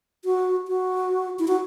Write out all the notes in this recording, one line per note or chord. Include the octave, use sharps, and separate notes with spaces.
F#4
F#4
E4
F#4